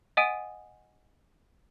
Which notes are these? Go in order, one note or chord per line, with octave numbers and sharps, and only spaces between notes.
D#5 F#5 G#5 D#6 D7 D#7